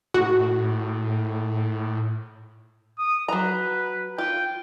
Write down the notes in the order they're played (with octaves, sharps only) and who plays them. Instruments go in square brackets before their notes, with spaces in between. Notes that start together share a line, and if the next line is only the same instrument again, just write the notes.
[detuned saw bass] A2 [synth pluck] F#4
[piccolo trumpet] D#6
[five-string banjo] F#3 A#5 [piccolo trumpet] B4
[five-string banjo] F4 [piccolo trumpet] G5